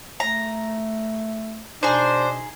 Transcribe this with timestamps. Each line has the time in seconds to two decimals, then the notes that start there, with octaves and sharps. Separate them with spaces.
0.20 A3 A#5
1.83 B2 D4 D#4 G#4 C5